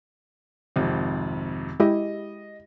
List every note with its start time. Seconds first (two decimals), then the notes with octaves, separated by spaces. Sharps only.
0.76 G#1 F2 C3
1.80 G#3 E4 G4 D#5